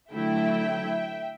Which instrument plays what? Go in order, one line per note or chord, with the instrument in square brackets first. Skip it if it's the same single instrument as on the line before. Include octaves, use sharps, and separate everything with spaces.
[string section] D3 F#3 A3 E4 E5 G5